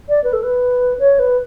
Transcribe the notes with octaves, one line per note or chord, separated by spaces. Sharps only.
D5
B4
A4
B4
C#5
B4